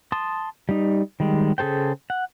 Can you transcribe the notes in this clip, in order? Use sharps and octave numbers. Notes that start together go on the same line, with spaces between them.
A5 C6 D#6
G3 D#4
D#3 G3 G#3
C#3 G#4 A4 C5 G5
F#5